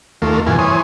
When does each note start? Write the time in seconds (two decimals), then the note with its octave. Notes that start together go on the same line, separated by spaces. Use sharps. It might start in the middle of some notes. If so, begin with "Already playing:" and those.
0.22 D#2 A3 A#3 F4
0.47 G2 B2 E3 F4 G#5
0.59 E3 C5 C#5 G#5 D#6